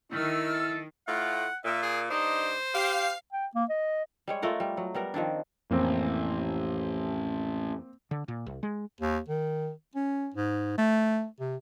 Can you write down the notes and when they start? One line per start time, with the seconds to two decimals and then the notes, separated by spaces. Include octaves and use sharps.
0.12 D#3 A3 E4 E6 F6
0.52 A4
1.07 A2 A3 F4 F#5
1.65 A#2 E5
1.83 G#4
2.10 G2 D4 D#4 C5
2.74 G4 F5 C7
3.33 G5
3.55 A#3
3.70 D#5
4.28 G3 G#3 C#5
4.42 A3 F4 A#4 F#5
4.60 G3
4.77 F#3
4.95 G3 B3 A#4
5.14 D#3 F3 C4 D4
5.71 A1 F2 A#3 C4
8.11 D3
8.28 A#2
8.46 C2
8.63 G#3
9.01 D#2
9.28 D#3
9.95 C#4
10.34 G#2
10.78 A3
11.40 C3